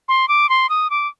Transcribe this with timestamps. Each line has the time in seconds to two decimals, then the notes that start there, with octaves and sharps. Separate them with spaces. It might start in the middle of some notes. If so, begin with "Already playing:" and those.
0.08 C6
0.28 D6
0.49 C6
0.69 D#6
0.90 D6